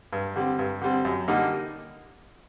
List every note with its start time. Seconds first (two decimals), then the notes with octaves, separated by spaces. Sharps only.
0.13 G2
0.36 D3 G3 C4
0.59 G2
0.81 D3 G3 C4
1.05 F#2
1.28 D3 G3 A#3 D#4